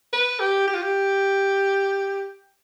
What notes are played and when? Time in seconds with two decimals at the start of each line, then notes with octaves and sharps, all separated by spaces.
0.13 B4
0.40 G4
0.67 G4
0.74 F4
0.82 G4